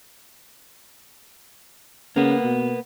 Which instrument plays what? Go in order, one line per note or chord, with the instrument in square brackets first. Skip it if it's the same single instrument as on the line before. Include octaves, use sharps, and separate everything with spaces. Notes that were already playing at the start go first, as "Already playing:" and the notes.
[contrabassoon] C#3 [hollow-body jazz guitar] A#3 B3
[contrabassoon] B2